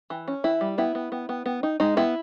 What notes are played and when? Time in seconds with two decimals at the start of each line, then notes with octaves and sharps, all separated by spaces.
0.10 E3
0.28 C#4
0.44 E3 E4
0.61 G3
0.78 B3 E4
0.95 B3
1.12 B3
1.29 B3
1.46 B3
1.63 D#4
1.80 G#3 D#4
1.97 B3 E4